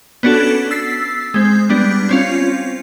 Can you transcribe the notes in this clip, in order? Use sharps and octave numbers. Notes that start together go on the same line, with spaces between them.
B3 C#4 D4 F#4 A4
E6 A6 B6 C7
G#3 C4
G3 B3 D4
C4 C#4 F4